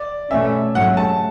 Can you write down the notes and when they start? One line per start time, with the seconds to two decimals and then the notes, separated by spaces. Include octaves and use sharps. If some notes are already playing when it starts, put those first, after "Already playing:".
Already playing: D5
0.30 B2 A3 C#4 E5
0.75 G#2 F#3 A3 C#4 F#5
0.97 A5